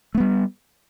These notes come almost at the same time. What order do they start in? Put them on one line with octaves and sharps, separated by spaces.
A3 B3 G3